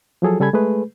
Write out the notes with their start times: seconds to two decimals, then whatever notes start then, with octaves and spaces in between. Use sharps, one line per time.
0.22 F3 F#3 G#4 A4
0.40 C#3 G3 A4 G#5 B5 G#6
0.53 G#3 A3 G#4 B4